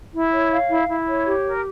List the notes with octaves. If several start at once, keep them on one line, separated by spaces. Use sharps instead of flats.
E4
C#5
F5
E4
E4
C#5
G4
A#4